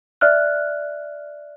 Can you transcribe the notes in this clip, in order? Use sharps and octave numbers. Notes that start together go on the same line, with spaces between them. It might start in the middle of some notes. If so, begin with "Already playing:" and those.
D5 E5 F6 F#6